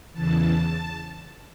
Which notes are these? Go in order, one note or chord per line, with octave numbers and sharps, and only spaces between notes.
E2 C#3 E3 A5